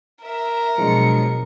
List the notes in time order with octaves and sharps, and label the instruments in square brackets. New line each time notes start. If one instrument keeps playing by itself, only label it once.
[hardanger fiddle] A#4 [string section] E5
[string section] B2 F#3 C#7 [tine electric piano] F3 G#3 D4